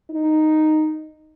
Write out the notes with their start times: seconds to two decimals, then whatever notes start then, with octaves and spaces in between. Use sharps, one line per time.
0.10 D#4